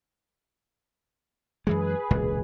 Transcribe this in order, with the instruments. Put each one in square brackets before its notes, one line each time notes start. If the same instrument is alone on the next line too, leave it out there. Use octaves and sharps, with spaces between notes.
[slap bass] F#2 E3 G#3 [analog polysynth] G#4 B4
[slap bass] E1 C#2 A#2